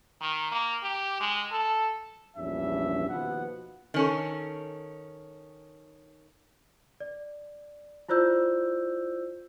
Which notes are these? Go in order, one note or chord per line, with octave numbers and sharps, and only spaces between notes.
D#3
A#3
G4
G#3
A4
A#1 E2 G2 C#4 E5
D#2 B2 F3 B3 F#5
D#3 C#4 A4
D5
E4 F4 C5 D5 E6 G6